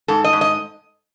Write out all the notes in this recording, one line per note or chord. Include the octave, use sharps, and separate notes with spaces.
G#2 A4
D#5
G#2
D#5